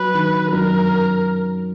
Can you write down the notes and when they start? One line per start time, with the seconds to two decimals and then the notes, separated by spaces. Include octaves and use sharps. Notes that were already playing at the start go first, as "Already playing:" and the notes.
Already playing: F#3 B4
0.14 D#3
0.52 F#2 A#4